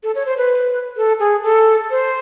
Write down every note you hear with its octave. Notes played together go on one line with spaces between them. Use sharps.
A4
C#5
C5
B4
A4
G#4
A4
C5